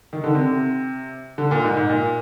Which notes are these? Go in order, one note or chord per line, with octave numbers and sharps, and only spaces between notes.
D#3
D3
C3
D3
A#2
G#2
G#2
A#2